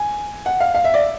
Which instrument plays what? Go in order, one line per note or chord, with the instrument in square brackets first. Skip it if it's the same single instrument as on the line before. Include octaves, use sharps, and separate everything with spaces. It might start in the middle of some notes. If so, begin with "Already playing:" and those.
Already playing: [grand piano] G#5
F#5
F5
F5
E5
D5